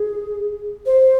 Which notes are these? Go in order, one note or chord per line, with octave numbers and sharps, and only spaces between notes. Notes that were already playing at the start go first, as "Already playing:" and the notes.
Already playing: G#4
C5